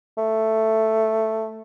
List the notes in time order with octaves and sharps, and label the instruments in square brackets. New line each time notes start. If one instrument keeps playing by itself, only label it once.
[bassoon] A3